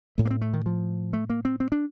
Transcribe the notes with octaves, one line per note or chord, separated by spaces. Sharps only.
A2 A3
A#3
C4
A3
D#3
F3
A3
A#3
C4
C4
D4